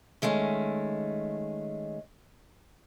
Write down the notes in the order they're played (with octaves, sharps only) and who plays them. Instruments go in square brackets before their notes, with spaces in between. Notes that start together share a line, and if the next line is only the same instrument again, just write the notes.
[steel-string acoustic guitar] D#3 G#3 A3 C#4